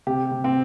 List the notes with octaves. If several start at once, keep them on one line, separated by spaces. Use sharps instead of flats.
C3 G4
C3
C4